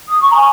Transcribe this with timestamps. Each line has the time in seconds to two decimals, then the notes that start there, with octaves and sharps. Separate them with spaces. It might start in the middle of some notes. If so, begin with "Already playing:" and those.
0.08 D#6
0.22 C#6
0.32 A#5
0.37 G#5